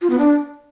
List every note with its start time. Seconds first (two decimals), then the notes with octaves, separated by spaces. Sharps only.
0.02 F4
0.10 B3
0.19 D4